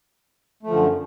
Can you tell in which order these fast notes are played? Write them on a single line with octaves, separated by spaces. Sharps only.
A3 F3 D3 F#2